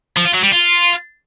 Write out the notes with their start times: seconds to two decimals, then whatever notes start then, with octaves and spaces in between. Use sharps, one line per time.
0.17 F3
0.25 F4
0.34 F#3
0.43 G3
0.52 F4